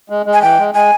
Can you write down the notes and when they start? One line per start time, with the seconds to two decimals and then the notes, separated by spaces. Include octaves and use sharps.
0.10 G#3
0.26 G#3
0.33 G#5
0.42 E3 G5
0.59 G#3
0.74 G#3 G#5